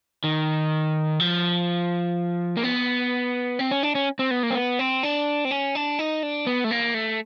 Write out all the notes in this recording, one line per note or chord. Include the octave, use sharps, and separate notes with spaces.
D#3
F3
A#3
B3
C4
C#4
D4
C#4
C4
B3
A#3
C4
B3
C4
D4
C4
C#4
D4
D#4
D4
B3
A3
A#3
A3